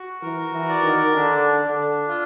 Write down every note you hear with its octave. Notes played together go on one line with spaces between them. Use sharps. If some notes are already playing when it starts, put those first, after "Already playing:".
Already playing: F#4
E3 A#4
E3
D5
D#3
D3 D4
D3 D4
F4